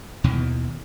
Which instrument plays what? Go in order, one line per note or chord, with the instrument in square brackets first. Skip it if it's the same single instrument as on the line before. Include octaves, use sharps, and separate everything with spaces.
[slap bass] D#2 B2 D#3 E3